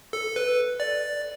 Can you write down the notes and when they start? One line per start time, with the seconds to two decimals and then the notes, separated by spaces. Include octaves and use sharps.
0.13 A4
0.36 B4
0.80 D5